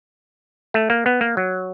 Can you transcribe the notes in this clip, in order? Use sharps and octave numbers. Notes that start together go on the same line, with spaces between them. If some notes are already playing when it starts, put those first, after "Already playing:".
A3
A#3
B3
A#3
F#3